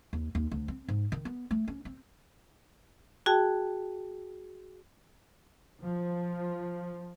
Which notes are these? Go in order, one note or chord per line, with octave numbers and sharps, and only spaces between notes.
D#2
D#2
D2
C4
G#2
D#3
B3
A3
C#4
C4
F#4 G#4 G5 A5
F3